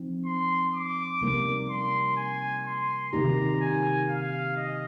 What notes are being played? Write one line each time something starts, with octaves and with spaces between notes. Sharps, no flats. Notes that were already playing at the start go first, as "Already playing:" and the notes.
Already playing: F3 C4 D#4
C6
D6
C3 G3 A#3 D#4 A#4
C6
G#5
C6
C3 D#3 A#3 D#4 G4 A#5
G#5
F5
D#5